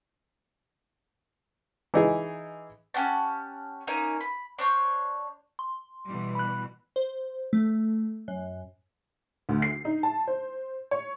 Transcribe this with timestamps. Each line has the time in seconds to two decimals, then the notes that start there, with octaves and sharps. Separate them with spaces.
1.94 E3 D#4 G#4
2.94 C#4 G4 F#5 A5
3.87 A#3 C#4 D#4 A#4
4.20 B5
4.58 D4 C5 C#5
5.59 C6
6.06 B2 E3 G3
6.35 B5 F#6
6.96 C5
7.53 A3
8.28 F#2
9.49 D2
9.62 C7
9.85 D#4
10.03 A5
10.28 C5
10.91 C#5